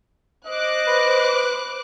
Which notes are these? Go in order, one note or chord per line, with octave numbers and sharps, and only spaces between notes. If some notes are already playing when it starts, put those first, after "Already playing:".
C5 D#5 D6 F#6
B4